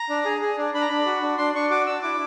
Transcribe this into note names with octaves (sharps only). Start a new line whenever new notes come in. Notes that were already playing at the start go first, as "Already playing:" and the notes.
Already playing: A#5
D4
G#4
G#4
D4
D4 B5
A#5
D4 B5
F#4
D4
D4 C6
D4 C#6
F#4 D6
D4 E6
E4 D6